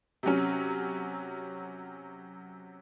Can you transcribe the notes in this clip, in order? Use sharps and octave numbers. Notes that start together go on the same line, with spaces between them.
C3 F#3 C#4